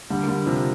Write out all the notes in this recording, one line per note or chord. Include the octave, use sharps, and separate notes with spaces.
D3 G3
A#3
D3 G3
C3 F3